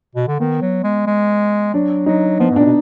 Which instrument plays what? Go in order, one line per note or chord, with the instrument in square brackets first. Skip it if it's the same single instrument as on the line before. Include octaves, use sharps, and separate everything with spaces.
[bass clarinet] B2
D3
[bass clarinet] D#3 [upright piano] B3
[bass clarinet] F#3
G#3
G#3
[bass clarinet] F#3 [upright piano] D4
[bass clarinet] F#3 [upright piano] D#4
[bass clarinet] F3 [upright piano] B3
[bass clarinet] G#2
[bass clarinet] A#2 [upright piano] D4
[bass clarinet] B2